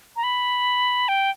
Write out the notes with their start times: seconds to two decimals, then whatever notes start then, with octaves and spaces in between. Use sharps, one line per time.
0.16 A#5
0.23 B5
1.08 G5